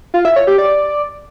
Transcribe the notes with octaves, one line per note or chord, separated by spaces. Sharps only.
F4
E5
C#5
G4
D5